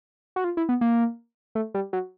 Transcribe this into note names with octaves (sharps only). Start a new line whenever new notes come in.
F#4
F4
E4
B3
A#3
A3
G3
F#3